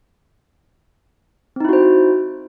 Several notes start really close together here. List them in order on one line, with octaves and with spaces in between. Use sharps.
C4 D#4 E4 F#4 C5